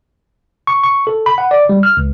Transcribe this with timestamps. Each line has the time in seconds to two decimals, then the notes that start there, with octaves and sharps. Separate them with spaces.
0.67 C#6
0.84 C#6
1.07 A4
1.26 B5
1.38 F#5
1.51 D5
1.69 G3
1.83 F6
1.97 C#2